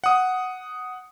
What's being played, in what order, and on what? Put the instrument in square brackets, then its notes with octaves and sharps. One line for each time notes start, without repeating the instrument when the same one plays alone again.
[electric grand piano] F#5 D#6